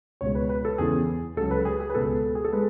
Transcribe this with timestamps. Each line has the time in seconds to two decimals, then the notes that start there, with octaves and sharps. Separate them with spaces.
0.21 C#2 B2 G#3 C#5
0.35 B4
0.49 B4
0.65 A4
0.78 E2 C#3 E3 G#4
1.37 C#2 C#3 F#3 A4
1.51 B4
1.65 G#4
1.80 G#4
1.90 B4
1.95 C#2 B2 G#3 A4
2.35 G#4
2.45 A4
2.53 G#3 B4